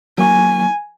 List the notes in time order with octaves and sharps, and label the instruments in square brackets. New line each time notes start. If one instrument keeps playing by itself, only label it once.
[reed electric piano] F#3 A#3 C#6 [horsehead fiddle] G#5